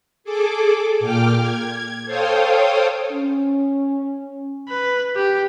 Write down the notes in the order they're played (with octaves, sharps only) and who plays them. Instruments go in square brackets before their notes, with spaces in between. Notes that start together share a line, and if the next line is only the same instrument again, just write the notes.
[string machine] G#4 A4 D6
A#2 G5 D6 F6
G#6
A4 C5 C#5 F5 G5 D#6
[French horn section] C#4
[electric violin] B4
G4